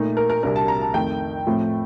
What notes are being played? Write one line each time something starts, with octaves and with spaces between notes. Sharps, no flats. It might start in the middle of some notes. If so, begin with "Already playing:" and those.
Already playing: A#2 A3 D#4
A#4
A#4
C2 C3 G3 D4 A#4
A5
A#5
A5
F2 D#3 A3 D#4 G5
A2 F3 A3 C4